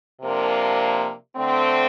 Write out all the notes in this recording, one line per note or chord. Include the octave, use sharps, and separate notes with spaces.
C3 F3 A#3 D4
D3 A3 C4